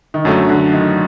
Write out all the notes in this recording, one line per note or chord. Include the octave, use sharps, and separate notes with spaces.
D#3
F#2 D3 F#3 A3
D3
D#3